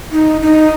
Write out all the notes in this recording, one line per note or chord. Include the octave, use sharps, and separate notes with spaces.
D#4
D#4